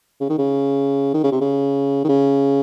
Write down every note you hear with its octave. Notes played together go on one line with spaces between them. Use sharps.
C#3
D#3
C#3
D#3
C#3
C3
C#3
D#3
C#3